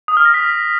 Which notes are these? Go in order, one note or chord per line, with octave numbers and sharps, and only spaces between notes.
D#6
F6
A#6
B6